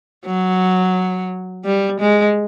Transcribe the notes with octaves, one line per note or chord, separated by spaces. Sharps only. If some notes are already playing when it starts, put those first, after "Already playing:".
F#3
G3
G#3